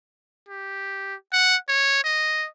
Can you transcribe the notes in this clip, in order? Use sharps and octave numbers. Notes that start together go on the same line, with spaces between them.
G4
F#5
C#5
D#5